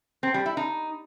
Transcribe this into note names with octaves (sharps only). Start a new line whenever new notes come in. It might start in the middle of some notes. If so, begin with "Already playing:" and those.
C4
G3
E4
D#4